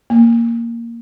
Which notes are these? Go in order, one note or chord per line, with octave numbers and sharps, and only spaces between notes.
A#3